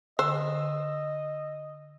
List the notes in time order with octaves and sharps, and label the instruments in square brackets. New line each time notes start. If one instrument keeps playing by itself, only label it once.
[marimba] D3 [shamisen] C5 [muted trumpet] D#5 [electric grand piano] E6